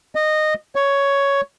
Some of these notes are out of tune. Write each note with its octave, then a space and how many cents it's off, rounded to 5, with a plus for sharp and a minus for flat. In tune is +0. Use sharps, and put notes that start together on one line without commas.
D#5 -15
C#5 +5